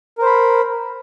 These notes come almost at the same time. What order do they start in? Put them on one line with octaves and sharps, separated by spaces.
A#4 C5 B5